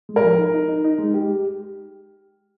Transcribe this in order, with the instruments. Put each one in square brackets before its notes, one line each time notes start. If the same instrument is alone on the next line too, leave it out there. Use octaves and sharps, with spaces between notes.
[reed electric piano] G#3
[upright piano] A#4
[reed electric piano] F3
D#4
D#4
D#4
D#4
G#3
G4